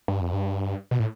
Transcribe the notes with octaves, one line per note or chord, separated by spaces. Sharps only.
G2
F2
G2
B2
A2